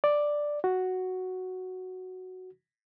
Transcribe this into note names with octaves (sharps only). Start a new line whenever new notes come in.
D5
F#4